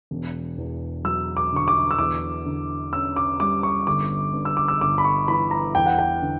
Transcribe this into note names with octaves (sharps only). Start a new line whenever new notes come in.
E1
E2
F#3 E6
D6
D3 C#6
D6
E6
E2 D6
D3
C#4 E6
D6
G3 D6
C#6
G1 D6
G2
E6
D6
E6
G1 D6
B5
C#6
E3 B5
A#5
E2 G5
F#5
G5
D3